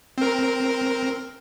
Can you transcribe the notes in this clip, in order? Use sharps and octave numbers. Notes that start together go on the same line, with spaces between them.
C4 A#4